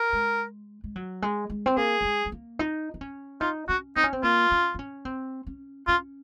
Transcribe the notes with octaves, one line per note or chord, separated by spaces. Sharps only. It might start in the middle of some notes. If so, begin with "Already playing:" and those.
Already playing: A#4
G#3
G#3
F#3
G#3
G#3
C4
A#3 G#4
A#3
G#3
G#3
A#3
D#4
D#4
C#4
D#4 F4
C#4 F#4
C4 D#4
C#4
C4
A#3 F4
C#4
D#4
C#4
C4
C#4
C#4 F4